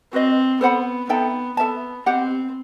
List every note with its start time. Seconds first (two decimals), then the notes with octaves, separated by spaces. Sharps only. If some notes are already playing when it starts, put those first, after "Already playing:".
0.13 C4 F#4 B4 D#5
0.61 B3 A4 C5 F#5 B5
1.09 B3 D#4 A4 E5 G5
1.57 B3 A4 E5 A5
2.06 C4 G4 D#5 F#5